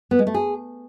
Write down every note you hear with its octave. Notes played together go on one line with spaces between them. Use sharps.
B3
G#3
A3
G#4